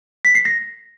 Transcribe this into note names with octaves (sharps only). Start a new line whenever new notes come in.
B6
C7
A#6